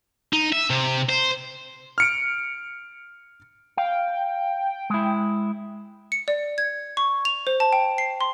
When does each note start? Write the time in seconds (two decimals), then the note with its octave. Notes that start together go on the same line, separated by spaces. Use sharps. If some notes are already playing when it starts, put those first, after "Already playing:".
0.33 D#4
0.53 E5
0.70 C3
1.09 C5
1.98 F6 C#7 D7
3.77 F5 G5
4.90 G#3 E4
6.12 C#7
6.28 D5
6.58 G#6
6.97 C#6
7.25 F7
7.47 C5
7.60 A5
7.73 G5
7.98 C7
8.21 C6